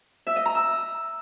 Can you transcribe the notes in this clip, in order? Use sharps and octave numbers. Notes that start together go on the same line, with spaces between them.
E5
D#5
A#5
E6